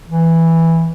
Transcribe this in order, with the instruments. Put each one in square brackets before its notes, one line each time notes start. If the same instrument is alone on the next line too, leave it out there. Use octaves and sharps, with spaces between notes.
[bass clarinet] E3